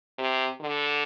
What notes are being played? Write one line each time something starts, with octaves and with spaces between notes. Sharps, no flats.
C3
D3